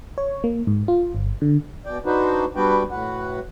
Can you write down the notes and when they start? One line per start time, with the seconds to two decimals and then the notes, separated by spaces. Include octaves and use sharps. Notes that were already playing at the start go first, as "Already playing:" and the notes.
0.18 C#5
0.44 A#3
0.67 G#2
0.88 F4
1.15 G1
1.42 D3
1.86 B2 D5 G5
2.06 D4 D#4 F#4 B4 C5
2.56 G3 B3 D4 F#4 B4 G5
2.91 A2 F#4 B4 F#5